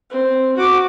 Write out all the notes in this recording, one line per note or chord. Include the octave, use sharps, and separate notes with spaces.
C4
F#4 D6